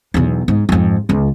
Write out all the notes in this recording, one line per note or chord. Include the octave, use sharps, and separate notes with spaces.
B1 E2
G#2
F2 G#2
C#2 F4